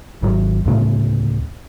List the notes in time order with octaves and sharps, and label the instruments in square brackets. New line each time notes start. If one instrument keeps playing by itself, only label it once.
[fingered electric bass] G#1 F#3
D2 A2 C#3 A3